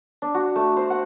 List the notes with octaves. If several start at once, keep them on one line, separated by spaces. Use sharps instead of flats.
D4
F#4
A3
C5
F#5